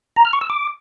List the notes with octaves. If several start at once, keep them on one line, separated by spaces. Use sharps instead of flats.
A#5
F6
C#6
E6
D6